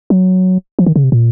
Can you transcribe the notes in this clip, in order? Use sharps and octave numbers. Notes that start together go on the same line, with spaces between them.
F#3
F3
D#3
C#3
C3
A#2